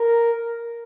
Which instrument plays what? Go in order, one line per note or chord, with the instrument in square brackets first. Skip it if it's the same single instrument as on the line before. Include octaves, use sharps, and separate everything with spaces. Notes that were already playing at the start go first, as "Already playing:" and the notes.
Already playing: [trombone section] A#4